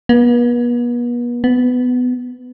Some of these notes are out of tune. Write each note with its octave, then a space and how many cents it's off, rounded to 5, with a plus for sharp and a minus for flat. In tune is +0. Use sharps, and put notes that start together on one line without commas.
B3 -40
B3 +15